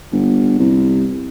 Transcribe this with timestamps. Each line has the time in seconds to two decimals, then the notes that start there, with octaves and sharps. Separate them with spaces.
0.12 G1
0.59 C2